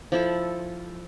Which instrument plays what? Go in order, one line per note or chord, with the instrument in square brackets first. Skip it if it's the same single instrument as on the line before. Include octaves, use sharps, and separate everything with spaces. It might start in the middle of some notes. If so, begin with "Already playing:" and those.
[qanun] F3 E4 A4